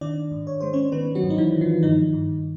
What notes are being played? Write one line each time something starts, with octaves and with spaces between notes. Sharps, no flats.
D#3 D4 D5
G#2
C#5
G#3 C5
C#4 C#5
D#3 B3 B4
F#3 F#4
G#2
D#4
E3 E4
D#3
F3 F4
G2 D#3 D#4
G2